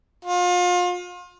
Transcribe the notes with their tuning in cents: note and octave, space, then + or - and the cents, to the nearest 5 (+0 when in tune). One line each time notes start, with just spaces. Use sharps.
F4 +35